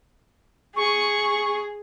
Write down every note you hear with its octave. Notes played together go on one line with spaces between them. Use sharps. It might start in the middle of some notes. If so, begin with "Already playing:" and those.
G#4 C#6